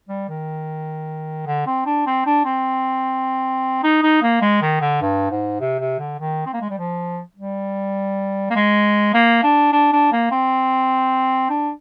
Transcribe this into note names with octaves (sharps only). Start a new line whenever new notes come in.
G3
D#3
D3
C4
D4
C4
D4
C4
D#4
D#4
A#3
G#3
D#3
D3
G2
G#2
C3
C3
D3
D#3
C4
A#3
G#3
G3
F3
G3
A#3
G#3
A#3
D4
D4
D4
A#3
C4
D4